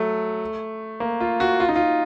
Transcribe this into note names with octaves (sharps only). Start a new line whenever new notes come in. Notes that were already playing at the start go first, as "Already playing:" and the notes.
Already playing: F#3 A3
A#3
F4
F#4
F4
D#4
F4